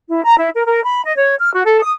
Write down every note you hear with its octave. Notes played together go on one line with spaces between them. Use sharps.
E4
A#5
E4
A#4
A#4
B5
D#5
C#5
F6
F#4
A4
D#6